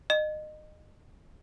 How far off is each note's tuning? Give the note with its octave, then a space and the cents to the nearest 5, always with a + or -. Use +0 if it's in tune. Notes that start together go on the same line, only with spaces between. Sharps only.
D#5 -25